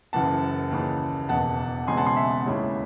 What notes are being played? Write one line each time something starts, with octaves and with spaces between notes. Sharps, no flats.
F#1 F#2 E3 F#5 A5
D#2 C#3 E3
E1 E2 D#3 F#5 A5
E1 E2 C#3 G#3 C4 G#5 C6
F#5 A5
G#5 C6
E5
D#2 C#3 G#3 C#4 E4